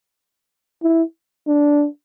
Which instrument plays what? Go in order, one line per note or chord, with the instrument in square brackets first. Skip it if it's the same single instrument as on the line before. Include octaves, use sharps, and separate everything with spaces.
[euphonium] E4
D4